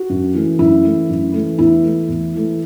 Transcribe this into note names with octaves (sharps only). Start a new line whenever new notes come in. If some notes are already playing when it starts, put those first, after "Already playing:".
Already playing: F#4
F#2
E3 A3
F#2 E4
E3 A3
F#2
E3 A3
E2 E4
E3 A3
E2
E3 A3